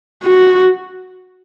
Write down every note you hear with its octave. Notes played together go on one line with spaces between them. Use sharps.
F#4